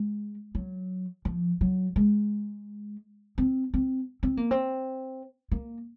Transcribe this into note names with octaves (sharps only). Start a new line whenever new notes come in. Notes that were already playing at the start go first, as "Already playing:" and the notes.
Already playing: G#3
F#3
F3
F#3
G#3
C4
C4
C4
A#3
C4
A#3